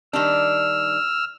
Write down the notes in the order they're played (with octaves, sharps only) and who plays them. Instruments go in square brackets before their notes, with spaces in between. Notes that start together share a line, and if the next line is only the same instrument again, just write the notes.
[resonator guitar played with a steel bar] D#3 G3 D4 [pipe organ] E6 F6